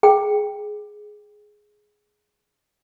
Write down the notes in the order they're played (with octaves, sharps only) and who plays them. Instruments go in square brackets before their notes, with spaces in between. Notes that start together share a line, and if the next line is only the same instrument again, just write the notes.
[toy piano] G#4 G5